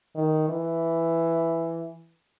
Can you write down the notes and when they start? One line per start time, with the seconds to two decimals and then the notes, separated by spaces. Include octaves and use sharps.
0.16 D#3
0.49 E3